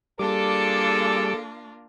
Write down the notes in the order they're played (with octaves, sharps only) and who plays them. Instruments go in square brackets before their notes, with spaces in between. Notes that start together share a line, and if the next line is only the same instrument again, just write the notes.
[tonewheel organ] G3 D6 [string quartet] A#3 D4 F4 [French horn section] G#4 A4